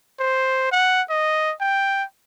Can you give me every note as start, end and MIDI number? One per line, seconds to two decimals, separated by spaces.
0.20 0.67 72
0.72 1.02 78
1.10 1.53 75
1.60 2.04 79